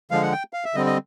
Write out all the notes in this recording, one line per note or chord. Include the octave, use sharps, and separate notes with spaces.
D3 F3 G#3 F5
F#5
G5
F5
E5
D3 G3 C4 D#5
D#5